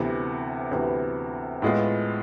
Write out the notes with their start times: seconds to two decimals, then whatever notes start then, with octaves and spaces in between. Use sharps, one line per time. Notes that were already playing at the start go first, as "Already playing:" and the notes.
Already playing: D2 C3 E3 B3
0.71 D2 C3 E3 B3
1.62 A2 G#3 B3 F4